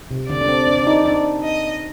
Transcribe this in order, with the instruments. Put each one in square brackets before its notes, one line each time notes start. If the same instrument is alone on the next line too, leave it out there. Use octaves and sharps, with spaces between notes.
[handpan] C3
[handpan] D3 [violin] D5
[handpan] D4
C4
D4
D4
D#4
D4
[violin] D#5